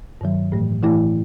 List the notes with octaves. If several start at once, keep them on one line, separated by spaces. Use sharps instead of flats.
G2 D#3 F#3
A2 E3 A3
A2 E3 A3 E4